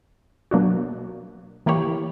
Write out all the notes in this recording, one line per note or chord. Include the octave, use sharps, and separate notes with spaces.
B2 F#3 A#3 D4 F#4
E3 A#3 E4 G4 C#5